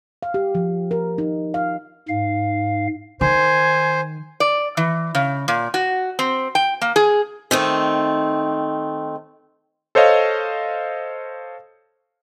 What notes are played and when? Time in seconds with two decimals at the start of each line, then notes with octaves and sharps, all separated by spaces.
0.23 F5
0.34 G4
0.55 F3
0.91 A#4
1.18 D#4
1.54 F5
2.09 G#2 F5
3.21 D#3 C5 G#5
4.40 D5
4.77 E3
5.15 C#3
5.48 A#2
5.74 F#4
6.19 C4
6.55 G5
6.81 A#3
6.96 G#4
7.51 D#3 A3 C4
9.95 A4 C5 C#5 D#5 F5